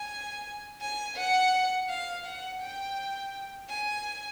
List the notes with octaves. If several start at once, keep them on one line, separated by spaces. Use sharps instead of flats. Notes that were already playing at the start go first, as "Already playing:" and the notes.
Already playing: G#5
G#5
F#5
F5
F#5
G5
G#5